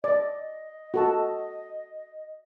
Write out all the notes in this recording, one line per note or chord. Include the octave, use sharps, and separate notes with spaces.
D5 D#5
F#4 A4 A5